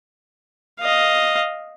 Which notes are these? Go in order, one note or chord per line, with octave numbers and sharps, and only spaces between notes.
D#5 F5